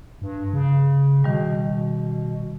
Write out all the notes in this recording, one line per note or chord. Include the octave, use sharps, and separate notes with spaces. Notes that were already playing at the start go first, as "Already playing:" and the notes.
G2
C#3
B2 D#3 G3